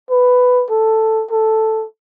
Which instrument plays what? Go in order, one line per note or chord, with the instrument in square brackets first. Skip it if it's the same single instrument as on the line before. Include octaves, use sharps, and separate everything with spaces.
[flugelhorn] B4
A4
A4